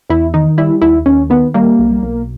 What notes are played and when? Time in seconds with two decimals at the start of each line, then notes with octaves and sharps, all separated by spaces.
0.09 E2 E4
0.34 D#3 D#4
0.58 G3 E4
0.81 D#2 E4
1.06 D#2 C#4
1.30 D#3 B3
1.54 G3 A#3
1.79 B1
2.02 B1